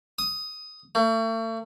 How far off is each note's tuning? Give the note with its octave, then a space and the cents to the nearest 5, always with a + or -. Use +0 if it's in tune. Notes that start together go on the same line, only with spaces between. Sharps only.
D#6 +15
A3 +40